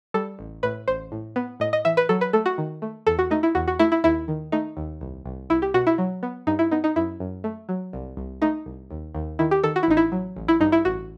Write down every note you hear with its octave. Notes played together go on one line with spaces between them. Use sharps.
G3 A4
A1
A2 B4
A1 C5
A2
B3
A2 D#5
D#5
E3 E5
B4
F#3 A4
B4
A3 A4
F#4
D#3
A3
E2 A4
F#4
A3 D#4
E4
E2 F#4
F#4
A3 E4
E4
D#2 E4
D#3
A3 D#4
D#2
C2
C2
C2 E4
G4
B2 F#4
E4
F#3
B3
G2 D#4
E4
B3 D#4
D#4
F#2 E4
F#2
A3
F#3
C2
C2
A3 D#4
C2
D#2
D#2
D#3 E4
G4
D#3 A4
F#4
E4
A1 D#4
E4
F#3
A1
E4
G2 D#4
E4
A1 F#4